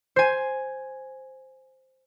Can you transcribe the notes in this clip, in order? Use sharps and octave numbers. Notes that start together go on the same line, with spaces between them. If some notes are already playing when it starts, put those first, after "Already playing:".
C5 G#5